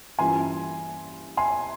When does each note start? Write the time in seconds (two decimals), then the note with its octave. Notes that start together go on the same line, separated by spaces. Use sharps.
0.19 G2 E3 A#3 C#4 F4 G#5 C6
1.37 G#5 C6